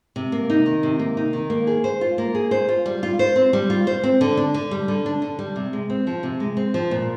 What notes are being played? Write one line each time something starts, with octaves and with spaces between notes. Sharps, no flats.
C3
A#3
D#4
D#3
C3
A#3
D#4
D#3
A#3
G#4
C5
F4
A#3
G#4
C5
F4
G3
F4
C5
C4
G3
F4
C5
C4
D3
D4
D3
G3
D3
D4
D3
G3
C3
G#3
C4
F3
C3
G#3
C4
F3
A#2